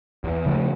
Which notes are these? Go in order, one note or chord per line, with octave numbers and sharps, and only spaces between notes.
E2
C#3 F3 A3